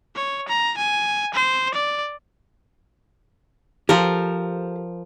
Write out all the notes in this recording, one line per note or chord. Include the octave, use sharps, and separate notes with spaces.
C#5
A#5
G#5
C5
D5
F3 G4 A4 A#4 C5